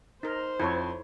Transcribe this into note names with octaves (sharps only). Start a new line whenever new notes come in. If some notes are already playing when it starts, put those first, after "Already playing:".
D#4 A#4 C5
F2 E4 A4 C#5